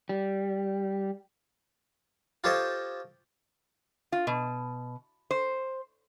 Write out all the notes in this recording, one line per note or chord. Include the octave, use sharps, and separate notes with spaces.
G3
F4 G4 A4 C5 C#5 D#5
F4
B2
C5